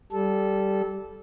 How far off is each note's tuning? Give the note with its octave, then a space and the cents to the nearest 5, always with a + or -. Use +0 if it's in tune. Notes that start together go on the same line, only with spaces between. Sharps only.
G3 -10 A4 -15